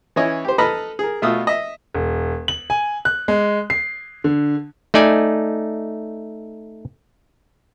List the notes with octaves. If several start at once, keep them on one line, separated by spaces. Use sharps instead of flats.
E3 C#4 E4 C#5 D#5
G4 C5
A4 B4 D#5 A#5 B5 F6
G#4 A#4
B2 A3 F4 D#6 E6
D#5 E5
E1
F#7
G#5
F#6
G#3
C7
D3
A3 D#4 D5 G#5